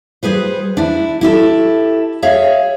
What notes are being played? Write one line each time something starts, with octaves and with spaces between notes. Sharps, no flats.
G3 G#4 B4 C5
D4 E4
E4 G4 A4
G#4 C#5 E5 F5